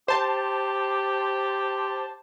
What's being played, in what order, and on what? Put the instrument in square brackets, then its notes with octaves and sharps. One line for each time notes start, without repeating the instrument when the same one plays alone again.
[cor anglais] G4 [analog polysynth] C5 A5